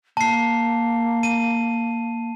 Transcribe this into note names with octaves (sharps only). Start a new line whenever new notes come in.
A#3 A5 C7
D#7